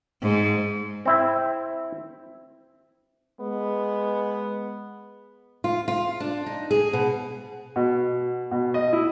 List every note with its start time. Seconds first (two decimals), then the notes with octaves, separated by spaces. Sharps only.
0.22 G#2
1.06 C4 E4
3.41 G#3 B3
5.64 F4
5.88 F4
6.20 D4
6.46 D#4
6.71 G#4
6.93 B2
7.76 B2
8.51 B2
8.74 D#5
8.93 E4